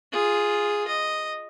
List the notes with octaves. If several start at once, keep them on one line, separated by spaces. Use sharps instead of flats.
F4 G#4
D#5